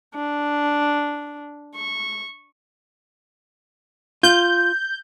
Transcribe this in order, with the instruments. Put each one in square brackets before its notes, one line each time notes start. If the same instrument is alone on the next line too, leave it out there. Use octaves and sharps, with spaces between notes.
[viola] D4
C#6
[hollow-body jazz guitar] F4 [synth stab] G6